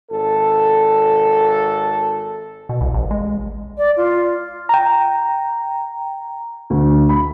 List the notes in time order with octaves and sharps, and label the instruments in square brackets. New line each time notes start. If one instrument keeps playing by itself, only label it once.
[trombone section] G#1 A4
[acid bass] B2
C2
A1
G#3
[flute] D5
F4
[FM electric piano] G5 A#5
[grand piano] D2
B5